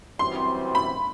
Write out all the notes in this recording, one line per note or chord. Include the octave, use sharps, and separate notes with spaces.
F#2 E3 G3 C4 F#4 C6
B5